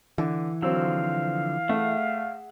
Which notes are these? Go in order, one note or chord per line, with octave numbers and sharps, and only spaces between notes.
D3 E3
D3 F3 F#3 C4 F5 E6
A3 G#4 E5 F#5